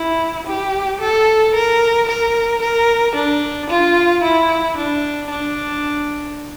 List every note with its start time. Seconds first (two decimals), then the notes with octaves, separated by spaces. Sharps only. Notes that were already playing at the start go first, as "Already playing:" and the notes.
Already playing: E4
0.46 G4
1.00 A4
1.54 A#4
2.08 A#4
2.62 A#4
3.15 D4
3.69 F4
4.23 E4
4.77 D4
5.30 D4